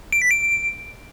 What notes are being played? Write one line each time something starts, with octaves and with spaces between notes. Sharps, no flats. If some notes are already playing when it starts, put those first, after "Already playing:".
D7
B6
D7